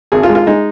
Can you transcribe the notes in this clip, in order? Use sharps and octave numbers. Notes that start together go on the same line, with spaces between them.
G#1 G#4
F4
G#3
F4
G#3 D#4